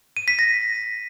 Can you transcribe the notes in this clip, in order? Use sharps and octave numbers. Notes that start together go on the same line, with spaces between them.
D#7
B6
A#6